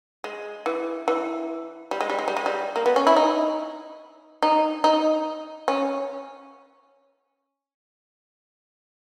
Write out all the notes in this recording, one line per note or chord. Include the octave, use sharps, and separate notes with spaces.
G#3
E3
E3
G3
G#3
G3
G#3
G3
G#3
G3
A#3
B3
C#4
E4
D#4
D#4
D#4
C#4